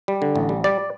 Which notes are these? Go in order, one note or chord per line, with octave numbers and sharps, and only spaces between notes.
G3
D3
A1
G3
G3 D5